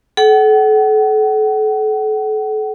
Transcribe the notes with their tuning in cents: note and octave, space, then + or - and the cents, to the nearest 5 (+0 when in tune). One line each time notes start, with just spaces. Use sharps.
A4 -35 F#5 +35